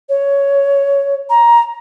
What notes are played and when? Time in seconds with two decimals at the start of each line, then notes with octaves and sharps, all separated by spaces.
0.09 C#5
1.29 A#5